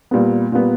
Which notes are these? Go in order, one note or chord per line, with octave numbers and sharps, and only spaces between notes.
A#2 G3 B3
A#2 G3 B3